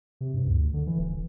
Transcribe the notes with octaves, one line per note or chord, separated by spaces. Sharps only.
C3
G2
D2
D3
E3
D#1